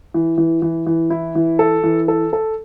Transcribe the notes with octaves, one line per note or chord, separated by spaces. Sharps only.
E3
E3
E3
E3
E4
E3
A4
E3
A4
A4